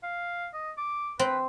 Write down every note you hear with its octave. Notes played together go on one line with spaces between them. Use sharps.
F5
D#5
D6
C4 B4